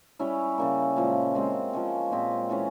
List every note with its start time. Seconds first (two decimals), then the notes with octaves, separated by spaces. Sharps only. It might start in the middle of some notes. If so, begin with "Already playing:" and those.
0.19 G3 C#4 E4
0.58 C#3 G3 A#3
0.96 A#2 F3 G#3
1.35 G#3 C4 G4
1.73 F3 G#3 C#4
2.11 A#2 G#3 C4 G4
2.50 E3 G#3 C#4